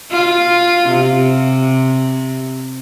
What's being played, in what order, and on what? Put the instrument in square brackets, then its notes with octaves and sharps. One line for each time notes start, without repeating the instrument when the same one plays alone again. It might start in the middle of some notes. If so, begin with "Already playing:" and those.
[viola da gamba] F4
C3